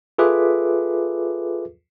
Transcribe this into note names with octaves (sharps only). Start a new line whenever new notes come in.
F4 G#4 A4 B4 E5 D6